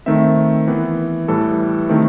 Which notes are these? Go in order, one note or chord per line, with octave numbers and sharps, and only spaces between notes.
D#3 A3 C4 E5
E3 B3
A2 E3 G3 A4
C3 D#3 A3 C4